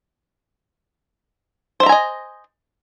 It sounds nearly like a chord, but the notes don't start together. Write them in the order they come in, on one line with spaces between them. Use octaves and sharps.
C5 E5 A#5 G#5 D#5